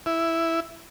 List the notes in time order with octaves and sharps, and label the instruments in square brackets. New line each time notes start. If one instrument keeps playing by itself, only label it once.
[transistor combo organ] E4